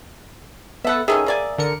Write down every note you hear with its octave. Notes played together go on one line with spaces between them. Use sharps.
B3 A4 B4 E5 F#5
D#3 A3 C#4 G#4 E5
A#3 D5 G#5
D3 A#4 C#7